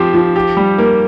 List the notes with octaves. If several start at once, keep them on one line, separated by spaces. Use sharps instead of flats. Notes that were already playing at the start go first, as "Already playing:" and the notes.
Already playing: F3 C4 G4
F3
G4
G3
A#3